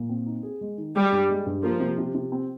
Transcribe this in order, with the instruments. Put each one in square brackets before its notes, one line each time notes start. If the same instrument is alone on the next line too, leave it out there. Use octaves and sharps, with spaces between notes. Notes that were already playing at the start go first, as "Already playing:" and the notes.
Already playing: [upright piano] A#2
C4
D#4
G#4
G#3
D#3
[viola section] G3 [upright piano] G#3
[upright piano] G2
G#3
G2
[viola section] F3 [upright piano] A#3
[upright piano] C3
C3
C3
C4